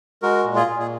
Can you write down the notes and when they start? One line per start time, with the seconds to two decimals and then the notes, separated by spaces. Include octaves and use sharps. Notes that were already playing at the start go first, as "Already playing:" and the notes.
0.22 G#3 F#4 A#4
0.44 A#2
0.55 F4 G#4
0.66 A#2
0.79 G#4